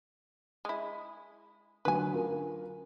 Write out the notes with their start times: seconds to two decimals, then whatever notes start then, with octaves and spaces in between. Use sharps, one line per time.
0.65 G#3 E4
1.85 D3 F#3 B4 G#5
2.13 C#4 F4 A#4